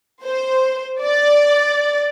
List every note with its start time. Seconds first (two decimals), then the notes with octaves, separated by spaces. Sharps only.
0.23 C5
1.02 D5